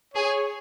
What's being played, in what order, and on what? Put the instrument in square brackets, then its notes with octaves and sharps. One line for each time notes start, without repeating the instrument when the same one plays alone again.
[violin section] G#4 [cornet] C#5